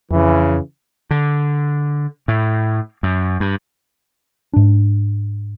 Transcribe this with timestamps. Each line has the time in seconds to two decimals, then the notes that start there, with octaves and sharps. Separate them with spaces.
0.11 F2 C#3 E3
1.11 D3
2.28 A2
3.03 F#2
3.40 G2
4.53 G#2 D4